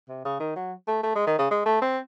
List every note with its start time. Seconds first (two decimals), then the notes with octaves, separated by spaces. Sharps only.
0.09 C3
0.25 C#3
0.40 D#3
0.56 F#3
0.88 A3
1.03 A3
1.15 G#3
1.27 D#3
1.39 C#3
1.51 G#3
1.66 A3
1.81 C4